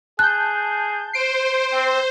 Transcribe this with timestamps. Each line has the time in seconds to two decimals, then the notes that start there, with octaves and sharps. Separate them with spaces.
0.19 G#4 A5 F#6 G6
1.13 C5 C7 D7
1.72 C4